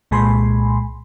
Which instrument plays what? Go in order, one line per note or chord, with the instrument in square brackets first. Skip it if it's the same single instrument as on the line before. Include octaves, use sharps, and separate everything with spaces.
[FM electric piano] C2 A#2 G#3 G#5 B5 C6